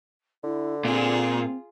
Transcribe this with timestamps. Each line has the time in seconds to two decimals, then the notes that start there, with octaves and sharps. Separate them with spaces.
0.44 D3 E4
0.85 A#2 C4 F4 G#4